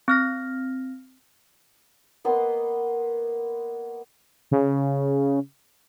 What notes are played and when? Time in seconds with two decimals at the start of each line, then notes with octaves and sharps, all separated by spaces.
0.08 C4 F6 A#6
2.25 A#3 B3 D#5 C6
4.51 C#3